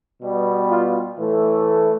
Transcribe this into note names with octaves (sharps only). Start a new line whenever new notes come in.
B2 G3 B3
F4
A2 E3 A3